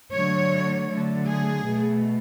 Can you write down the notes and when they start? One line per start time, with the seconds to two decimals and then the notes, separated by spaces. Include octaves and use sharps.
0.14 D3 F#3 A3 C#5
0.89 D3 F#3 A3
1.27 G#4
1.64 B2 A3